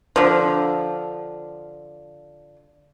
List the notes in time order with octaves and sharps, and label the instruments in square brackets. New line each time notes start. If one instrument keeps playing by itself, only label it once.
[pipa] D3 F3